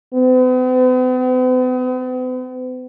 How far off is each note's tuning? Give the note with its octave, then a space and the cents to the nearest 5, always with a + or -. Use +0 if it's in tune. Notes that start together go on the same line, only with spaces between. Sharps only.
B3 +45